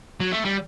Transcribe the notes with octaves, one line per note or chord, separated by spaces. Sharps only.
F#3
A3
G3